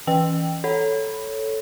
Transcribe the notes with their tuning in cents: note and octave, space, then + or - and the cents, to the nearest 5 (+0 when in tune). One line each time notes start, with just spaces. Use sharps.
E3 +0 B4 +0 G5 +0
A4 +0 C#5 +0 B5 +0